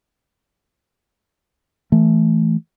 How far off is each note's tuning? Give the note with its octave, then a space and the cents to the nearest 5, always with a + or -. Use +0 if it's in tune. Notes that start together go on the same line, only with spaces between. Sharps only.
E3 +0 A3 +0